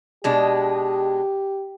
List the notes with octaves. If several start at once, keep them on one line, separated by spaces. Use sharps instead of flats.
B2 G#3 D4 G4